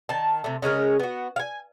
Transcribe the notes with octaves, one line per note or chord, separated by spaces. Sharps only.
D#3 A5
C3 A3
C#3 G#3 C#4 A#4
B3 F#4
F5 G#5